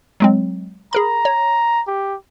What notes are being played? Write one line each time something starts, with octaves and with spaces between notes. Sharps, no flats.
F#3 G#3 C4
G#4 A#4 A#5 B5
C#5
G4